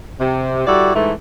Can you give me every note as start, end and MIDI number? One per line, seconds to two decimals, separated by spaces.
0.19 0.66 48
0.66 0.93 55
0.66 0.93 64
0.66 0.93 66
0.66 0.93 69
0.66 0.93 74
0.94 1.11 44
0.94 1.11 52
0.94 1.11 57